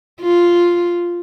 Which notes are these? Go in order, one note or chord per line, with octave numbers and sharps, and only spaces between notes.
F4